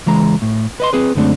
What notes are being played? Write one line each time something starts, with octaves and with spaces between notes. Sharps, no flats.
C#2 E3 G#3 A#5
A2
B4 D#5 C6
C4 G#4 B4
F#2 D3 G#3 A3 C4 D4